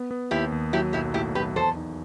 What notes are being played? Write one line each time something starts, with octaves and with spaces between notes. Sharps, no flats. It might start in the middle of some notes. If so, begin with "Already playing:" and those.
Already playing: B3
B3
D#2 E4 G4
D#2
F#3 E4 G4
B1 E4 G4
A2 E4 G4
B1 G4 B4
E2 A4 C5
D#4